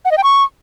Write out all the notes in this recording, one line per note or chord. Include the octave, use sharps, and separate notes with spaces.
F#5
D#5
G5
C#6